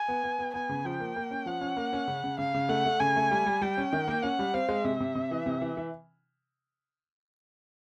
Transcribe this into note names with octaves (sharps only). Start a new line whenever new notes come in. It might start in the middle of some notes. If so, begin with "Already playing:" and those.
Already playing: G#5
B3
B3
B3
B3 G#5
C#3
F3 G5
A#3
A#3
C#4
F3 F#5
C#4
A#3
C#4
C#3
C#3
C#3 F5
C#3
A3 F#5
A3
C#3 G#5
A3
G3
G3
G3 G5
C#4
D#3
A#3
C#4 F#5
G3
C4 F5
G#3
C3 E5
C3
C3
E3
C3
E3
E3